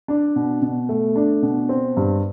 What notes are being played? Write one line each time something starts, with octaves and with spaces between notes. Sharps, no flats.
D4
B2
B2
A3
D4
B2
C4
G2